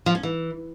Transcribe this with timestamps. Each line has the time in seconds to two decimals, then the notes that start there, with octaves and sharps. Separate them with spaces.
0.06 F3
0.15 C#4
0.23 E3